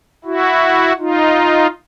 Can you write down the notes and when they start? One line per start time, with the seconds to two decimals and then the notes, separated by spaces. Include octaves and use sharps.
0.25 E4 F#4
0.99 D#4 F4